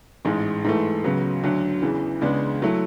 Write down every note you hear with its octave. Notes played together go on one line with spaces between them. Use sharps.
A1 G#2 G#3
G#2 E3 A3
C#2 C#3 F#3 B3
D2 D3 F#3
E2 C#3 E3
C#2 C#3 G#3 B3 D4
F#3 A3 E4